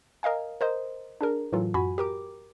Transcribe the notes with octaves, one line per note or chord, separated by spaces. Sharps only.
A#4 D#5 F5 G#5
A#4 C5 D#5
D4 G#4 A#4
A2 E3 F#3 F4 A4
F#2 F#4 G#5 B5
G4 A#4 D6